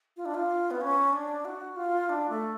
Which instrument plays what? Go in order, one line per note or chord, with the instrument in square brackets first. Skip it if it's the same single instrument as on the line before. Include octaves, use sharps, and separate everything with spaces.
[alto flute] F4
D4
F4
B3
C#4
D4
F#4
F4
D4
A3